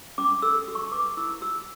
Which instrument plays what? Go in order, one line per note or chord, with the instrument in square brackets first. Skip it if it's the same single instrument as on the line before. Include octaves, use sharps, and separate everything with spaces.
[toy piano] C#4 D6
A4 E6
F#4
C#6
B4 D6
E4 E6
F#4 E6